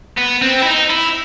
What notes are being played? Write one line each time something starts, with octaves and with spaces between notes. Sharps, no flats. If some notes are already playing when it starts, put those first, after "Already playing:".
B3
C4
E4
D#4
E4